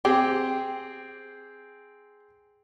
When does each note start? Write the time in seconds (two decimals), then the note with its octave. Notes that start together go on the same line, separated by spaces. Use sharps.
0.05 C4 G4 G#4